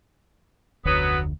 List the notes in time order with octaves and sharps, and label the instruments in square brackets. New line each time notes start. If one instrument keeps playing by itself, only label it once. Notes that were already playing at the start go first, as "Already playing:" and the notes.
[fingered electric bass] F1 D2 [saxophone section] F#3 B3